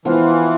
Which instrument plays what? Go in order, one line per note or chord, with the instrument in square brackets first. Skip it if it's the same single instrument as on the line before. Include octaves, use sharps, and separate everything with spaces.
[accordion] E3 [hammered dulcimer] F3 B3 F4